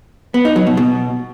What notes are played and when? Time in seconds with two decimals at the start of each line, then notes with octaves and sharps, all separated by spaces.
0.34 B3
0.45 D#4
0.56 F#3
0.67 B2
0.77 B2